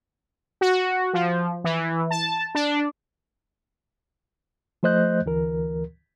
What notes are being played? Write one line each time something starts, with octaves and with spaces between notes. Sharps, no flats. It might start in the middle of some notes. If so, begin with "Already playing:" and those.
F#4
F3
E3
A5
D4
F3 A3 C5 D#5 F#6 G6
D2 E3 A#4